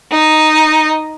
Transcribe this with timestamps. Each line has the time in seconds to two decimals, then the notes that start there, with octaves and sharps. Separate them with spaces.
0.12 D#4 D#5